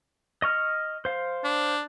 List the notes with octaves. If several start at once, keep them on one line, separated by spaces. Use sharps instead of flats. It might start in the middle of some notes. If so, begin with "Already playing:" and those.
D#5 C#6 F6
C5 F5
D4